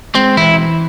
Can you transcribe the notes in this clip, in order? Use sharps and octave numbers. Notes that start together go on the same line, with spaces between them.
G#3 C4
E3 E4